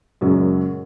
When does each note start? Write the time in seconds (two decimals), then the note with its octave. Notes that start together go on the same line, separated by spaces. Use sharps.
0.21 F#2 A#2 C#3 F#3 G#3